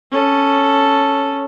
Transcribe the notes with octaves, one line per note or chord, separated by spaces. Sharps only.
C#4 A4